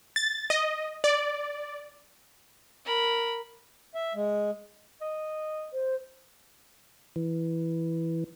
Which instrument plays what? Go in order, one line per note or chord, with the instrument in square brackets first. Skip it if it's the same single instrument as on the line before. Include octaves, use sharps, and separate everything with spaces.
[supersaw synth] A6
D#5
D5
[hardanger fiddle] A#4 B5
[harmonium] E5
G#3
[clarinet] D#5
[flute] C5
[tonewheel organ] E3